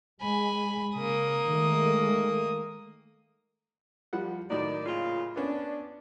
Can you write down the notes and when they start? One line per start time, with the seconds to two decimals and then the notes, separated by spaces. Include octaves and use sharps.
0.21 G#3 G#5 B5
0.95 C#3 A#3 D#6
1.47 D#3 G#3 A3
4.13 F3 G3 F#5
4.50 A2 D#3 F#3 D#4 D5
4.86 A#2 C#3 F4
5.36 B3 C#4 D4